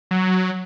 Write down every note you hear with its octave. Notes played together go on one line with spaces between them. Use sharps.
F#3